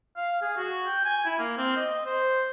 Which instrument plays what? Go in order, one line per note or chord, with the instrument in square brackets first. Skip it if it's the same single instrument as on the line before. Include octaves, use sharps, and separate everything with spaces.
[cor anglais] F5
G#4
F#4
G5
G#5
E4
A#3
C4
D#5
C5